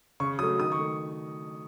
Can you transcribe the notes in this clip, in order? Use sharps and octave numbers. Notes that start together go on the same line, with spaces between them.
C#3 C#6
F#3 A3 D#6
D#3 D#6
C#6
A3